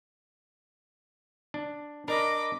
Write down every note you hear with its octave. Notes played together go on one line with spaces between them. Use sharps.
D4
D4 A#4 D#5 B5 D6